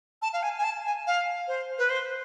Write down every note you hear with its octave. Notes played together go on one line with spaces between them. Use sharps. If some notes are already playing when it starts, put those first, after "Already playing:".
A5
F5
G#5
G#5
A5
G#5
F5
C5
B4
C5